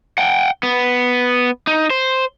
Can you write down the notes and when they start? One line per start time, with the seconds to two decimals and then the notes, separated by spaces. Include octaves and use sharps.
0.18 F#5 G5
0.63 B3
1.67 D#4
1.90 C5